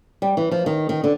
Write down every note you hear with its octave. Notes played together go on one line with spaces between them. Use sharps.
G3
E3
F3
D#3
D#3
D3